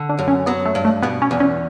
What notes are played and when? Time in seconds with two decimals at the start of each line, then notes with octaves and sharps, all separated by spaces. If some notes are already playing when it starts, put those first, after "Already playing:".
Already playing: D3
0.09 D4
0.19 F#2
0.28 C#4
0.46 F#3 B3
0.66 A3
0.75 G2
0.85 A3
1.03 B2 B3
1.22 C#4
1.31 E2
1.40 C#4